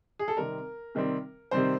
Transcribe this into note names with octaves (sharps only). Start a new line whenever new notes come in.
G#4
A4
C3 D#3 G3 C4 A#4
C3 D#3 G3 C4
C3 D#3 G3 C4 C5